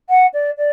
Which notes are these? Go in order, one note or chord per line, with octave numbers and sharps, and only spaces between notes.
F#5
D5
D5